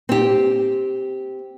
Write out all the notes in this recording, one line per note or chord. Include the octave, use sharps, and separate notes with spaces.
C4 G4